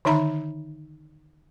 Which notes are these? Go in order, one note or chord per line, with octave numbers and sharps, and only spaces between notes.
D3 D#3 D#4 E5 A#5 B5